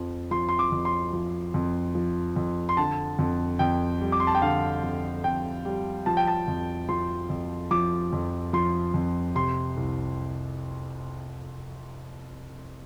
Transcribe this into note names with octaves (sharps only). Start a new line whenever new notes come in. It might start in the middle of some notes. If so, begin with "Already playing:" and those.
Already playing: F2 F3
F3 C6
C6
D6
F2
C6
F3
F2
F3
F2
C6
D3 A5
F2
F2 G5
G3
D6
C6
A5
G5
D3 F5
F2
F2 G5
G3
F3 A5
G5
A5
F2
F3 C6
F2
F3 D6
F2
F3 C6
F2
C3 C6
C2